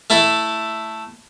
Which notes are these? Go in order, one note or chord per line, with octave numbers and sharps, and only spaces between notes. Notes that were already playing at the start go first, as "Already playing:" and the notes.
A3 E4 A4